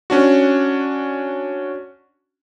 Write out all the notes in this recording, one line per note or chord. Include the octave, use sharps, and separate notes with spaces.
C#4 D4 F#4